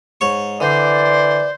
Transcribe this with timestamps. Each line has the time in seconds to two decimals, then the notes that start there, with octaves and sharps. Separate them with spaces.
0.21 G#2 C#5 C#6
0.60 D3 E3 C5 D5